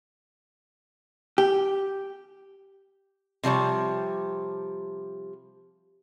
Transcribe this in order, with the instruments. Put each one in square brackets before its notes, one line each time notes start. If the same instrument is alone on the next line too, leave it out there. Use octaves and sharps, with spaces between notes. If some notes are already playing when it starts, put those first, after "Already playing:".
[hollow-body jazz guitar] G4
[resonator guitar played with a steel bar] C3 F3 G3 C#5